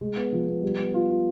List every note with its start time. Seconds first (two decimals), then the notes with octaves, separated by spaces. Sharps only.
0.01 G#3
0.17 B3
0.33 F3
0.48 B3
0.63 G3
0.79 B3
0.94 F4
1.10 F4